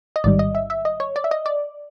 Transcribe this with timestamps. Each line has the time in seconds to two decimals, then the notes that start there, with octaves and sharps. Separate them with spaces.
0.16 D#5
0.24 A1 G#2 D#3 G3 D5
0.39 D#5
0.55 E5
0.70 E5
0.85 D#5
1.00 C#5
1.16 D5
1.24 E5
1.31 D#5
1.46 D5